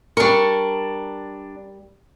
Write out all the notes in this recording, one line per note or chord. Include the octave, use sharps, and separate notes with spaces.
G3 D4 A#4 C#6